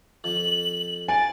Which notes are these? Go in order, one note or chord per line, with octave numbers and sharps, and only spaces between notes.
F2 F#7
G#5 A6 D7